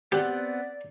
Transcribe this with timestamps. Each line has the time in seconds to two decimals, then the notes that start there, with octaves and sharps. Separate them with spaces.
0.12 B3 C4 G4 D5 F#5